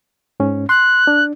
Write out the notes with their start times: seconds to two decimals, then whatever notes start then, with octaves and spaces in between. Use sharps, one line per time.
0.40 G#2 C#4
0.69 C6 F#6
1.07 D4